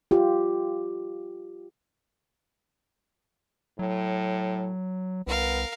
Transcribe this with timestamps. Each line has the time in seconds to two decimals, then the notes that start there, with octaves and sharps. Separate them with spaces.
0.11 F4 G4
3.79 A2 F#3
5.27 C2 B3 A#4 F5